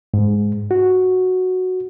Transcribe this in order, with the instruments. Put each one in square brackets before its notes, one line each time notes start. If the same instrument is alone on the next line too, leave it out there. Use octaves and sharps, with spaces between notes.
[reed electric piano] G#2
F#4